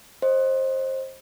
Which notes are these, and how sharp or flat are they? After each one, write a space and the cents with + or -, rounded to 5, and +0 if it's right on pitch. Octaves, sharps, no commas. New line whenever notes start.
C5 +20 D#5 +0